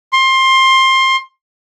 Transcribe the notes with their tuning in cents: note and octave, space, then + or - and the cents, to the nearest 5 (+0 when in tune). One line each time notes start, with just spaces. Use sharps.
C6 +20